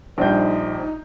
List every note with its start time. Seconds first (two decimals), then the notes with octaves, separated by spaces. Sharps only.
0.18 A#1 G3 D4 D#4 C5 G6